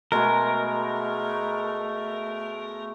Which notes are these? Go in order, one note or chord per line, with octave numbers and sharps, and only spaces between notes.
B2 G#3 A3 A#4